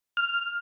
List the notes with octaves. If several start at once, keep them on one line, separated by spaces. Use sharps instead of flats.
F6